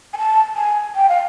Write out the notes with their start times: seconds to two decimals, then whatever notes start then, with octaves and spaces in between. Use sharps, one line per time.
0.13 G#5
0.18 A5
0.56 G#5
0.95 G5
1.09 F5